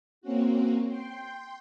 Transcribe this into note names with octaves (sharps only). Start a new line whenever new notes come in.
A#3 C4 C#4 F#4
G5 C6